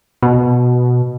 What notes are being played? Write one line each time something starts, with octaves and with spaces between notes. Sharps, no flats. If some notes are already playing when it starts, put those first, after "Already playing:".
B2